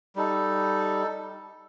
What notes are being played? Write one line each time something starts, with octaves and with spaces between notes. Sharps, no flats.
G3 D#4 A4